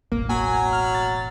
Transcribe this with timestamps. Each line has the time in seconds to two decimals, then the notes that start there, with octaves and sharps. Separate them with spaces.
0.12 E1 A1 A#3
0.29 F#3 G#5
0.73 F6
0.94 A6